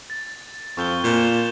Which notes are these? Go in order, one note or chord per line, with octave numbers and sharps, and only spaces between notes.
A6
F2 C#6 G6 G7
A#2 G6 E7